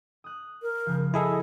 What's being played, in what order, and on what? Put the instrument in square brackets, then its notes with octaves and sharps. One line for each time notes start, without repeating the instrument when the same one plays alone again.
[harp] D#6 F#6
[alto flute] A#4
[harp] C#3 F3
[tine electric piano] E4 G#4 A4 [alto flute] D#5